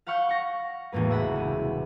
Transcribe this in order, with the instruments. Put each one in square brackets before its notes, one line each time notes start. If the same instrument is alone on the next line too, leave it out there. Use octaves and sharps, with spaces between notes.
[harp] F5 F#5 B5 C#6 F6 G6
C#6 A#6
E1 C#2 A2 A#3 B4
G#4 E5 F#5 B5
C2 C#3